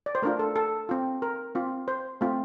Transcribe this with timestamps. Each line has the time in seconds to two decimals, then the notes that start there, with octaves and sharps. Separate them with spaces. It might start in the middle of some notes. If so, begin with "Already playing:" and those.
0.06 D5
0.15 C5
0.22 A3 D4 F4 A#4
0.39 A4
0.56 A4
0.89 C4 F4
1.22 A#4
1.55 C4 F4
1.88 C5
2.21 A3 C4 F4